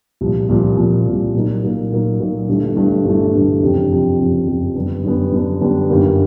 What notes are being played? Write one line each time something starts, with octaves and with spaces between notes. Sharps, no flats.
C2 A#2 F3
C2 A#2 F3
C2 A#2 F3
C2 A#2 F3
A#2 F#3 A#3 D#4
A#2 F#3 A#3 D#4
A#2 F#3 A#3 D#4
A#2 F#3 A#3 D#4
G1 G2 E3 A3
G1 G2 E3 A3
G1 G2 E3 A3
G1 G2 E3 A3
F#1 F2 C3
F#1 F2 C3
F#1 F2 C3
F#1 F2 C3
F#2 D3 G3 B3 D4
F#2 D3 G3 B3 D4
F#2 D3 G3 B3 D4
F#2 D3 G3 B3 D4
G1 F#2 D#3 G3 A#3